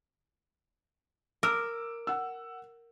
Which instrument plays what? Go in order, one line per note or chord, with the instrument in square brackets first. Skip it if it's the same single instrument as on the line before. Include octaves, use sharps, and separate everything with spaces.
[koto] A#4 [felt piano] D6 E6
[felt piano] F#5 E6